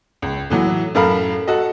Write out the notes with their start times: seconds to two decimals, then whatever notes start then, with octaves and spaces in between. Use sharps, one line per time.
0.22 C#2
0.50 A2 E3 F#3
0.95 F#2 A2 A4 A#4 F5 B5
1.47 F#4 A4 D#5